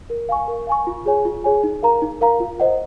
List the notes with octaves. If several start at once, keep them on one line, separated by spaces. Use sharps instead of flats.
A#4
F5 G#5 C#6
A#4
F5 G#5 C#6
F4
G#4 C#5 G#5
F4
G#4 C#5 G#5
D#4
A#4 F5 A#5
D#4
A#4 F5 A#5
F4
C5 D#5 F#5